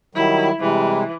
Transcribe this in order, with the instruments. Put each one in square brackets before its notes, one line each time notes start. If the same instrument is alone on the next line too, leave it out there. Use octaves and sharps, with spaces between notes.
[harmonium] D#3 F#3 G3 [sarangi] E4
[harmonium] C3 G3 G#3 [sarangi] E3